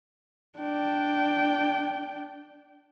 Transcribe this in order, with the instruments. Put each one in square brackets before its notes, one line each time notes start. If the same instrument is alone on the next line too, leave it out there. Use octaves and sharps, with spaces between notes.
[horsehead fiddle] D4 G5